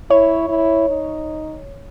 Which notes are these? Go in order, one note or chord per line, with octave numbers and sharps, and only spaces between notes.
E4 C#5
E4
D#4